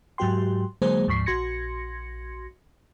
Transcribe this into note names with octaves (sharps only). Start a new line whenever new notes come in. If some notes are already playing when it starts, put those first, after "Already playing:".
G#2 F#3 F#4 G4 G5 C6
D3 F#3 G#3 A#3 G#4 C5
D2 G#2 F3 C#6 B6 C7
A#1 F#4 C6 G#6 A#6 C#7